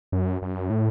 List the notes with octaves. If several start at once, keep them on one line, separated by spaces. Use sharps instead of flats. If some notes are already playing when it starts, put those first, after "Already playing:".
F#2
F#2
A2